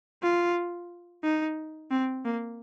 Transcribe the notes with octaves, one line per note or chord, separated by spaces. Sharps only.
F4
D#4
C4
A#3